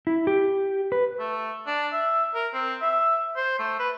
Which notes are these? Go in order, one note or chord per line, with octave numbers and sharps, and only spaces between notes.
E4
G4
B4
A3
D4
E5
A#4
C4
E5
C5
A3
B4